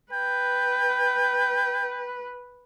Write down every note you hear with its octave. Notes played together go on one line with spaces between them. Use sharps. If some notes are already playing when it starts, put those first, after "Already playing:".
B4 G5